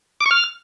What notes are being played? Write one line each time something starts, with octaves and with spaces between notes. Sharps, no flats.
D6
C#6
F6